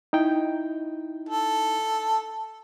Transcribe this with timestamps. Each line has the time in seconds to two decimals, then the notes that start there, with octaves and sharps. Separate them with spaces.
0.13 D#4 E4 G5
1.29 A4